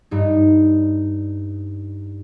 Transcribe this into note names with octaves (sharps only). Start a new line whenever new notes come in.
G2 D#4